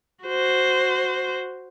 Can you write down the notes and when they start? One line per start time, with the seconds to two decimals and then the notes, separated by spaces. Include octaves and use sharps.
0.24 F#4 C5